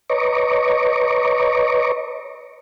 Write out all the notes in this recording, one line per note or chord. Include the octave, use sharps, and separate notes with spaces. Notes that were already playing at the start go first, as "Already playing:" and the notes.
B4 C#5 D#5 A#5 C#6 D6